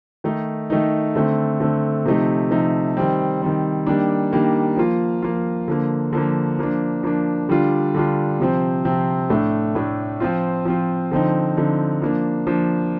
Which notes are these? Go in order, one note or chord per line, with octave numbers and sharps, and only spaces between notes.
D#3 A3 D#4
D#3 A3 D#4
D3 A3 C4
D3 A3 C4
C3 F3 A3 D#4
C3 F3 A3 D#4
D#3 G3 C4
D#3 G3 C4
D#3 G3 A#3 D4
D#3 G3 A#3 D4
F3 A#3 F4
F3 A#3 F4
D3 F3 A#3
D3 F3 A#3
F3 A#3 D4
F3 A#3 D4
D3 G3 D4 F4
D3 G3 D4 F4
C3 F3 C4
C3 F3 C4
A2 A3 D4
A2 A3 D4
F3 C4 F4
F3 C4 F4
D3 F3 C4 D#4
D3 F3 C4 D#4
F3 A#3 D4
F3 A#3 D4